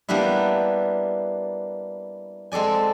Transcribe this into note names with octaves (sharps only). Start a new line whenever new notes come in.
G3 A#3 B3 D4 E4
G#3 C4 A4 D5 G#5